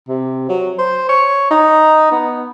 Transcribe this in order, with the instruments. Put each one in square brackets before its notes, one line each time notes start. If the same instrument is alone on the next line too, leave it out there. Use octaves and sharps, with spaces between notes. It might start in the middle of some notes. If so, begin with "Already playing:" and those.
[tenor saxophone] C3
F#3
C5
C#5
D#4
B3